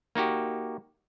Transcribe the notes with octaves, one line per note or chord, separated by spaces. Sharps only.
A#3 D#4 F#4 G4